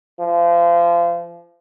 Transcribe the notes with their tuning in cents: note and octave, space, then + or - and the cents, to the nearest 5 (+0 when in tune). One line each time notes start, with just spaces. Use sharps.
F3 -30